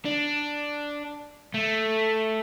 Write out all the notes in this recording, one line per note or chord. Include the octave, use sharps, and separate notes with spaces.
D4
A3